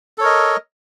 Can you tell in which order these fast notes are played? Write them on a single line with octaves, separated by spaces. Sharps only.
A4 C#5 A#4 D#5